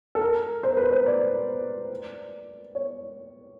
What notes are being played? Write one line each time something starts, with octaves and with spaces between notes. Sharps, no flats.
A4
A#4
C5
B4
C5
D5
C#5